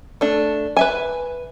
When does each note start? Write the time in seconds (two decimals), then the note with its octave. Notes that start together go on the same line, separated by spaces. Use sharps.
0.21 A3 D4
0.77 B4 E5 G#5